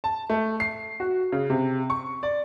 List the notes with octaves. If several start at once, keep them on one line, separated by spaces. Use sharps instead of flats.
A5
A3
C7
F#4
C#3
C3
C#6
D5